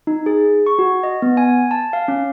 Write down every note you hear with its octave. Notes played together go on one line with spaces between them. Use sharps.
D#4
G#4
C#6
F#4
D#5
B3
G#5
A5
F5
C#4